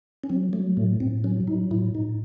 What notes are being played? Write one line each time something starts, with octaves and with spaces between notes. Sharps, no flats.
C#4
F#3 C4
F#3 A3
A2 A3
A2 C4
F#3 C#4
F#3 D#4
A2 E4
A2 D#4